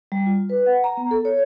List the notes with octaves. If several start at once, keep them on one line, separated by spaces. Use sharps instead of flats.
G3
F4
B4
F#5
A#5
B3
A4
C#5